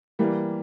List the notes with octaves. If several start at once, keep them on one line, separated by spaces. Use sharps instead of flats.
E3 G3 A#3